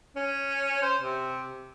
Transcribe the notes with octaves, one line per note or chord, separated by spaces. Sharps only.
C#4
C5
C3